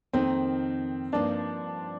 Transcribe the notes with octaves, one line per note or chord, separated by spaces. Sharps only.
F2 D#3 A#3 C4 D#4
G2 F3 A#3 D4 D#4